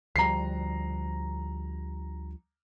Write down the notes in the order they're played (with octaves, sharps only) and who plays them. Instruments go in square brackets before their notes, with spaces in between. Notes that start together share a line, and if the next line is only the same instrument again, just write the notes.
[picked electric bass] D2 F3 G3 [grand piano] A#5 C7